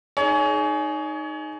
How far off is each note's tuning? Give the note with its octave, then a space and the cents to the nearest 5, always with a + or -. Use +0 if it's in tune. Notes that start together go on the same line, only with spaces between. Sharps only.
D#4 -10 G#4 +20 C#5 +30